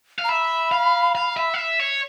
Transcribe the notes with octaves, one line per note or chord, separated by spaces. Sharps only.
F5
A#5
E5 B5
F5
F5
E5
F5
E5
C#5